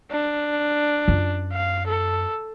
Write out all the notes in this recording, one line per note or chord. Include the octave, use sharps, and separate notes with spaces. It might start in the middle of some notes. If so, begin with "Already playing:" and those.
D4
F#2 F4
F5
A4